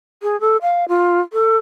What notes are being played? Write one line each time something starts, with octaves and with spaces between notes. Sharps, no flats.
G#4
A4
F5
F4
A4